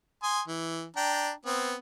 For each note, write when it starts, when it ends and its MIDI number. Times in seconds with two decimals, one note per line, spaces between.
0.23 0.41 80
0.23 0.41 84
0.23 0.41 87
0.48 0.85 52
0.97 1.31 62
0.97 1.31 79
0.97 1.31 82
1.46 1.75 59
1.46 1.75 60